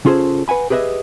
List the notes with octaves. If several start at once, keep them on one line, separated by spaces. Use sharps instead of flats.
C#3 C#4 F4 G#4 A4 C5
B4 F#5 G#5 B5
G4 G#4 B4 C#5 D#5 E5